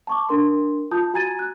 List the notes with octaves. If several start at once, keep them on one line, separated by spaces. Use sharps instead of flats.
A5 C#6 D6
D4 A#4 C6
F4 A5 D#6 G6
F#4 G#5 A#5 G#6 A6 D#7
F#6